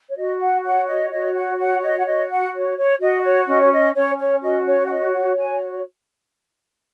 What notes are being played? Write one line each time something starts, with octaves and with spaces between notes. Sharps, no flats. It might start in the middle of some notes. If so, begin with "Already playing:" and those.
C#5
F#4 D#5
F#5
C#5 F#5
D#5
F#4 D#5
F#5
C#5 F#5
D#5
F#5
F#4 D#5
F#5
C#5
C#5
F#4 D#5
C#5
C#4 D#5
C#5
D#5
C#4 C#5
C#5
F#4 D#5
C#5
F#5
C#5 D#5
F#5
F#4 G#5